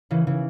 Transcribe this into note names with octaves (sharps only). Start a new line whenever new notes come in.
C#3 E3
C#3 E3